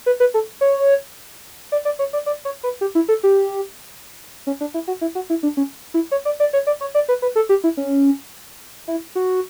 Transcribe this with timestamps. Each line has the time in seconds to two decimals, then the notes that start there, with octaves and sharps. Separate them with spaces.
0.06 B4
0.20 B4
0.34 A4
0.61 C#5
1.72 D5
1.85 D5
1.99 C#5
2.13 D5
2.26 D5
2.45 C#5
2.63 B4
2.81 G4
2.95 E4
3.08 A4
3.23 G4
4.47 C#4
4.61 D4
4.74 E4
4.88 F#4
5.01 E4
5.15 F#4
5.30 E4
5.43 D4
5.57 C#4
5.94 E4
6.11 C#5
6.25 D5
6.40 D5
6.53 C#5
6.67 D5
6.81 C#5
6.95 D5
7.09 B4
7.22 B4
7.36 A4
7.49 G4
7.64 E4
7.77 C#4
8.88 E4
9.15 F#4